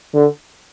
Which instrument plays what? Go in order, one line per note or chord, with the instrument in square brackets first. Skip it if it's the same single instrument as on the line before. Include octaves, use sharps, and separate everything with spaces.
[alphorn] D3